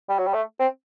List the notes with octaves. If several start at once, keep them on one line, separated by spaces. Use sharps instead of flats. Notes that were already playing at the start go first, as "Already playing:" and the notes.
G3
F#3
G3
A3
C4